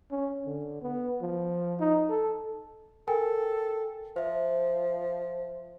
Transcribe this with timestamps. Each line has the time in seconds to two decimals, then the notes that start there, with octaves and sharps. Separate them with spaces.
0.11 C#4
0.46 D3
0.82 B3
1.22 F3
1.80 D#4
2.09 A4
3.08 A4 A#4 G5 G#5
4.16 F3 C5 E5